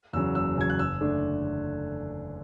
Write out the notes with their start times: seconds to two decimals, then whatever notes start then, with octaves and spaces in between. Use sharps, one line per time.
0.13 E2 C#3 F#3 E6
0.35 F#1 E6
0.57 E2 C#3 F#3 G#6
0.70 F#6
0.79 F#1 E6
1.01 D3 A3 D4